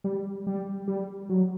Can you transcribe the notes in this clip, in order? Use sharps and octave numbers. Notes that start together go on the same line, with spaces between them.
G3
G3
G3
F#3